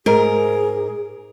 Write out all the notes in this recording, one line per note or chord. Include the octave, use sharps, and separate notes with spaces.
G#2 G#4 A#4